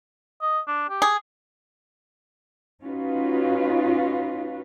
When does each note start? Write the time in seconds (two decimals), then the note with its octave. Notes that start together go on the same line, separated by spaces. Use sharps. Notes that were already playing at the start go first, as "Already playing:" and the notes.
0.42 D#5
0.68 D4
0.90 G4
1.02 G#4
2.83 C#4 D#4 F4 F#4 B4